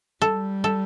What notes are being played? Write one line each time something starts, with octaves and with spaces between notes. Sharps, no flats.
G3 A4
A4